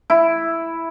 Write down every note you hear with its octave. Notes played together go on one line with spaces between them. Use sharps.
E4